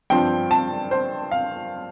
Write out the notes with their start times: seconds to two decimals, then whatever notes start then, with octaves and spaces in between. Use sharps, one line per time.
0.10 G2 F3 C4 G5
0.51 A5
0.91 C5
1.31 F5